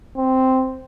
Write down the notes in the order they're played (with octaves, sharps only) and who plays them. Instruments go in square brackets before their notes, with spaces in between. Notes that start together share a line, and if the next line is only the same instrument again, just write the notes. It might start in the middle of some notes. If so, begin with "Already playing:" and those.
[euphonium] C4